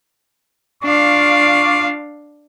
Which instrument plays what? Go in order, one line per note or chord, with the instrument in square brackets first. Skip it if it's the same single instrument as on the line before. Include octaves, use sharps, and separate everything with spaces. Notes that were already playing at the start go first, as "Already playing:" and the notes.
[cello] D4 F5 [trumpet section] F4 D5 C#6